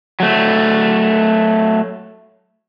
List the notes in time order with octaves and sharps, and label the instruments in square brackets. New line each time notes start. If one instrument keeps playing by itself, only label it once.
[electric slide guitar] F#3 A3